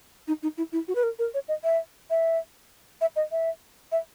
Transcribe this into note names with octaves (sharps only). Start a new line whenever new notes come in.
D#4
D#4
E4
E4
F#4
B4
A#4
A#4
C#5
D#5
E5
E5
E5
D#5
E5
E5